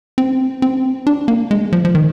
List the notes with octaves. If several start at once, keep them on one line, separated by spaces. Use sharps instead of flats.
C4
C4
D4
A#3
G#3
F3
F3
D#3